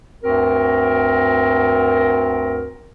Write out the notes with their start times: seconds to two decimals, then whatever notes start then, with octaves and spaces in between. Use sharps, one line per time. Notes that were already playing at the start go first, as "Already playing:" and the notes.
0.22 D2 G2 C4 F#4 A#4